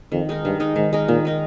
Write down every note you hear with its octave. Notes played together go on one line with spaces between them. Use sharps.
F2 D#3
G#3 D#4 A#4
G2 D#3
G#3 D#4 A#4
G#2 D#3
G#3 D#4 A#4
A#2 D#3
G#3 D#4 A#4